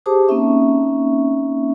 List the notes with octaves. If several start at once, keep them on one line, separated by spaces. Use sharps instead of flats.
G4 G#4 C5 A5 D6 D#6
A#3 C4 C#4 D#4 E5 C#6